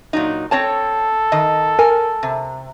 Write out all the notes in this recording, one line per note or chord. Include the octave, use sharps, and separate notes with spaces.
A#2 F#3 D#4
C4 A4 C#5 A5
D#3 D#5
A#4 G#5
C3